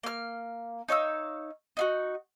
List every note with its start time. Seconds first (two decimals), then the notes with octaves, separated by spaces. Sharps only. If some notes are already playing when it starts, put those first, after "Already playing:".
0.03 A#3 F6
0.88 D#4 C#5 F5 E6
1.77 D#4 F4 F#4